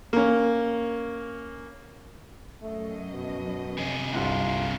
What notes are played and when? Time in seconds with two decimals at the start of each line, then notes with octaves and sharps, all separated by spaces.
0.13 A#3 C#4
2.62 F#2 A3 D#5
3.11 B2
3.78 C3 G#4
4.14 G1 C2 F4